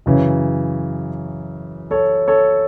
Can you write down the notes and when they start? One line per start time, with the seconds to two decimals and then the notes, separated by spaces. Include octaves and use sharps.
0.06 F#2 C#3 E3
1.91 A4 C#5
2.28 A4 C#5